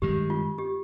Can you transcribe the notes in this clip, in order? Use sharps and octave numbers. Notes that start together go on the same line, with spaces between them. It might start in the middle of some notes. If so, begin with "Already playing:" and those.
G2 D#3 G#3 G4
F4
G4